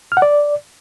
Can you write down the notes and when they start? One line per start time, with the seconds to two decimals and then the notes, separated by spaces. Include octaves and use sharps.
0.12 F6
0.17 F#5
0.22 D5